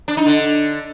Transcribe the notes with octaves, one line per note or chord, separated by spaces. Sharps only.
D4
D#4
D3